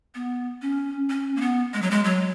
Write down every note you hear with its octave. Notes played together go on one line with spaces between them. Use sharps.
B3
C#4
C#4
A#3
B3
G#3
F#3
G#3
F#3